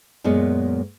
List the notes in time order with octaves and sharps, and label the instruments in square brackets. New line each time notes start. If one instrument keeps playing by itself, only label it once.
[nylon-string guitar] F#2 A#2 G#3 B3